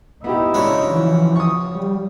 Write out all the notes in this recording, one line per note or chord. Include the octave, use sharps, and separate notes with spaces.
B3 D#4 E4 F#4 G4
G#2 C#3 D4 F#4
E3 F3
C#6 D#6
G3